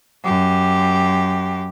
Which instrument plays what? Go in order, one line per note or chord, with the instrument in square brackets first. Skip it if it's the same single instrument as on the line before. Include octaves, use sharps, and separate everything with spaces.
[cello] F#2 G4